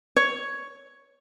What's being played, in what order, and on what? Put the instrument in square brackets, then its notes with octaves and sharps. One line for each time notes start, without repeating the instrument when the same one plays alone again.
[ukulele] C#5